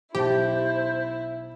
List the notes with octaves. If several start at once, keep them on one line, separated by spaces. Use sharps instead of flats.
B1 E4 G4 C5 A5